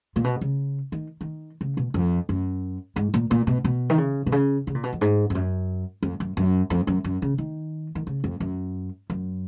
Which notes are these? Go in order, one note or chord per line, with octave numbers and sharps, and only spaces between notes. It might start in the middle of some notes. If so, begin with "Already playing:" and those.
A#2
B2
C#3
D#3
D#3
C#3
B2
F2
F#2
G#2
A#2
A#2
B2
B2
D#3
C#3
B2
C#3
C#3
A#2
B2
F2
G#2
F2
F#2
F2
F#2
F#2
F2
F#2
F#2
C#3
D#3
D#3
C#3
F2
F#2
F#2